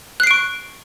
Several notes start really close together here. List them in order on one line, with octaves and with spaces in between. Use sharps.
F#6 C7 D7 C#6